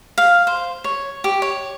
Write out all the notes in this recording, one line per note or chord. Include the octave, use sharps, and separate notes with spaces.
F5
C5
C#5
G4
C#5